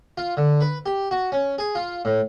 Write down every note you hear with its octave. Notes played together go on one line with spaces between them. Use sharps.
F4
D3
B4
G4
F#4
C#4
G#4
F4
A2